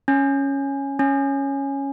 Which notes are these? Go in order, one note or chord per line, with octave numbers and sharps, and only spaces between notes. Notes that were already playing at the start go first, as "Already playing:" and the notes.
C#4
C#4